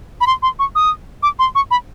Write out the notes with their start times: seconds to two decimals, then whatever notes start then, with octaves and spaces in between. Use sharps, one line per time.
0.21 B5
0.27 C6
0.43 C6
0.59 C#6
0.75 D#6
1.23 D6
1.39 C6
1.55 C#6
1.71 B5